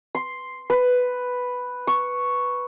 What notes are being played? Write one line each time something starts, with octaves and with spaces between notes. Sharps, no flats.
C6
B4
C#6